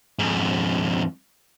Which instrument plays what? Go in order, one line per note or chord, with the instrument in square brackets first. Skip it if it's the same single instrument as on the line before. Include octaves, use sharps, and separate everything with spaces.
[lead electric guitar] F2 G#2